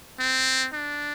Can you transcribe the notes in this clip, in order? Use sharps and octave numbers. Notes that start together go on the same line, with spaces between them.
C4
D4